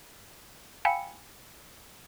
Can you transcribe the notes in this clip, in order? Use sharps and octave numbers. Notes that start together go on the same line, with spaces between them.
F5 G5 G#5 B5 E6 C#7